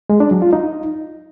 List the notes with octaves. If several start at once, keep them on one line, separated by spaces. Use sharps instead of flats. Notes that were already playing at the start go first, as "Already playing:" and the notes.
G#3
D4
F#3
F4
D#4